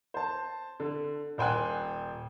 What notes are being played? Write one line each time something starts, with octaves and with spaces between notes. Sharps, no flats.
C5 A5
D3
D#1 C5 G5 G#5 F#6